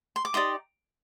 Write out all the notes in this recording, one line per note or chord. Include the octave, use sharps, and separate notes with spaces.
C6
D6
D#4 G4 D5 C6 D#6